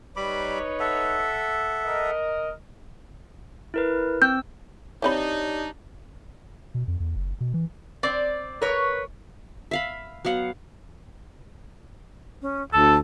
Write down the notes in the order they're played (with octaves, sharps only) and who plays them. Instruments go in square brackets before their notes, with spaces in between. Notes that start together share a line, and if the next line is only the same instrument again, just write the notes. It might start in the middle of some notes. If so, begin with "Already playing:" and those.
[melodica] G3 B5 D6 [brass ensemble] D#4 B4 C#5
[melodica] A4 E5 F#5
[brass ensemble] A#4 D#5
[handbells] E4 A#4 B4
[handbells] C4 E6 [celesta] G6
[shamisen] E3 C4 B5 [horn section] D4 D#4 [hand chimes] G4 D5 [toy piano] C#5
[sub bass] B2
F2
E2
F#1
B2
E3
[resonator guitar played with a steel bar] C4 [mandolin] D5
[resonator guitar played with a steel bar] A#4 C#5 [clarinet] B4
[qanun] E5 F5 B5
F#3 B3 F5 F#5
[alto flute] C#4
[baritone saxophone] D2 [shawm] A4 [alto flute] A5